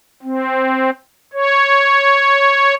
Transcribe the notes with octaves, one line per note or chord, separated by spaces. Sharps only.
C4
C#5